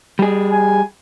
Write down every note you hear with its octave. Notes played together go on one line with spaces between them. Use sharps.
G3 G#4
G#5